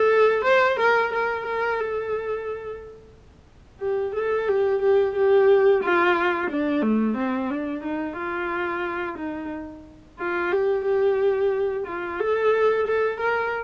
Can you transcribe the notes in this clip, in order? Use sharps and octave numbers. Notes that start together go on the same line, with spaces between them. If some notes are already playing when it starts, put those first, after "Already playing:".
Already playing: A4
C5
A#4
A#4
A#4
A4
G4
A4
G4
G4
G4
F4
D4
A3
C4
D4
D#4
F4
D#4
F4
G4
G4
F4
A4
A4
A#4